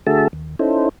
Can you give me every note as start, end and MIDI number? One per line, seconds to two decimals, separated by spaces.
0.07 0.28 50
0.07 0.28 57
0.07 0.28 66
0.07 0.28 68
0.07 0.28 76
0.07 0.28 81
0.33 0.55 39
0.59 0.89 61
0.59 0.89 63
0.59 0.89 64
0.59 0.89 69
0.59 0.89 72